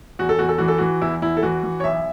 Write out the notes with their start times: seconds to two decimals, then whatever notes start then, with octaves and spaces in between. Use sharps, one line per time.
0.19 E2 F#4
0.29 A4
0.39 E2 F#4
0.49 A4
0.58 E3 F#4
0.68 A4
0.78 E3 F#4
1.01 E2 E4
1.22 E2 E4
1.37 A4
1.43 E3 F#4
1.63 E3
1.80 C#5
1.84 B1 E5